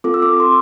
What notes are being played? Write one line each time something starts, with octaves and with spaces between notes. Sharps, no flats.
C4 F4 A4 D6
E6
D6
C6